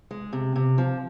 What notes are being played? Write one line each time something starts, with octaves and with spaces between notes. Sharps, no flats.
G#3
C3
C3
F3